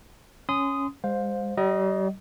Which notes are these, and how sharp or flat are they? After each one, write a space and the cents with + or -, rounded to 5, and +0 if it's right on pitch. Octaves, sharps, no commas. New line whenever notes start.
C#4 +0 C6 -30 D#6 +0
G#3 -40 C5 +0 F5 +25
G3 -40 D#5 +0